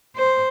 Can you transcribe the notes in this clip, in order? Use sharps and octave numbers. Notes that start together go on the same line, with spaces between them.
C5